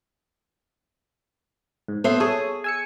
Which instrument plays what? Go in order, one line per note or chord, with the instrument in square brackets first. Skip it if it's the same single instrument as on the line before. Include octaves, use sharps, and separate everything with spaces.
[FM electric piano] G#2
[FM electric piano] A3 C6 [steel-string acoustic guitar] B3 C5 E5
[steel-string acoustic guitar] G#4 [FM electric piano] A4 C#5 D#6
[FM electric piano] G#5 E6 C#7